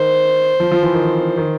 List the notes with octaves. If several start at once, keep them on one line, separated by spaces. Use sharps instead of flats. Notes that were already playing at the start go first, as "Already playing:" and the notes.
Already playing: D#3 C5
F3
F3
E3
D#3
D#3